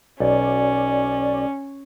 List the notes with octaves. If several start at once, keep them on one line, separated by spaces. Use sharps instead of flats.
B1 C#4 D5